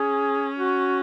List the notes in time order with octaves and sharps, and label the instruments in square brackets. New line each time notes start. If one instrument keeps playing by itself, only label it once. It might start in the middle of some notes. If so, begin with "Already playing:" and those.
Already playing: [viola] C#4 [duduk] G#4
[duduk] F#4